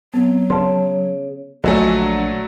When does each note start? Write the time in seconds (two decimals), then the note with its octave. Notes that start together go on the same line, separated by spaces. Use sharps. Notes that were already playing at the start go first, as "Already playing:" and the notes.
0.14 F#3 B3 C4
0.50 C#3 A5 C6
1.64 A#1 D3 F#3 A3 D4 D#5 G#5